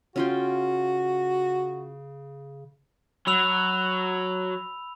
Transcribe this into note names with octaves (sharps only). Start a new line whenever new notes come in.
C#3 C#4 F4 F#4 G5
F#3 B5 E6 F7